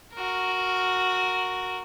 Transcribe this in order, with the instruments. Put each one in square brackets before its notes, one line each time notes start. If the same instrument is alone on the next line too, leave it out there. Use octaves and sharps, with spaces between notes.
[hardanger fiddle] F#4 A#4